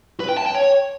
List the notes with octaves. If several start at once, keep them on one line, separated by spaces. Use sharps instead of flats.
B4
G5
A5
G5
C#5